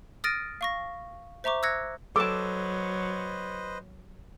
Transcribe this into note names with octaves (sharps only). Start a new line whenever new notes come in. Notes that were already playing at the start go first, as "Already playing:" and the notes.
D#6 F6 A6 A#6 D7 D#7
F5 C#6 A#6
C5 E5 A#5 C#6 D6
E6 F#6 G#6 A#6 C#7
F#3 A4 B4 C5 D#5 A5 D6